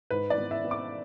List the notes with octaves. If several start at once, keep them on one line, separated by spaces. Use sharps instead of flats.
G#2 B4
D5
B3
E5
B3
D6